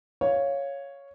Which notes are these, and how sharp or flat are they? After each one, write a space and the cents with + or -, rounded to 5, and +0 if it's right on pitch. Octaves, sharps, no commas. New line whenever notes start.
C#5 +0 F5 +0